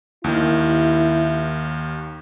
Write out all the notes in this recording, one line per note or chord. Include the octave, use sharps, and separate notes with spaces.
D#2 D#3 E4